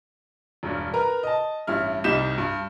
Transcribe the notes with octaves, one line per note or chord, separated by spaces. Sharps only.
E1 G2 D4
A#4 B4 A#5
D#5 A5
A1 G2 G3 E4 F6
C2 G3 D#4 G6 B6 E7
G2